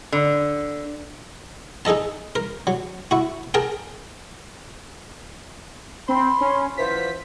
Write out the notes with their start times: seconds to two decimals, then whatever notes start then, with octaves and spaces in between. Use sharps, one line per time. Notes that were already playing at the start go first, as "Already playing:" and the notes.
0.12 D3
1.85 D#4 G#4 A4 D#5 A5
2.36 A#4
2.67 F#3
3.11 E4 F#4
3.54 G#4 A#4 G5 A5
6.09 C4 B5 C6
6.41 C#4
6.77 E3 F#3 F4 C5 B6